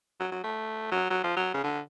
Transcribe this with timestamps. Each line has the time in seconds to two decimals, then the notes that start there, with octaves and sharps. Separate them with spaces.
0.20 F#3
0.31 F#3
0.44 A3
0.91 F#3
1.10 F#3
1.23 F3
1.36 F#3
1.54 C#3
1.64 D3